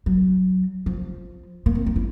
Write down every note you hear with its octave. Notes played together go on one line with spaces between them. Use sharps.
F#3
F3
A#3
C4
D#4
E4